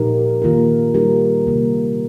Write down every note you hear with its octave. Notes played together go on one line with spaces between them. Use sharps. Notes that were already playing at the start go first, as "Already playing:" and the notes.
Already playing: A#2 F3 D#4 G4 A#4
D#3 A#3 F4 A#4
G3 D#4 G4 A#4
C3 D#3 A#3